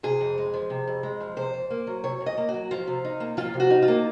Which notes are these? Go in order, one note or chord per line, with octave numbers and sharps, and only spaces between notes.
C3 G#4
F2
G#3
F3
C3
F2
G#3
F3
C3 C5
F2
A#3
F#3
C3 C#5
F2
D#5
A#3
F#4
F#3
F3 F4
C3
D#4
A#3
F3 F4
C3
F#4
D#4
F4
A#3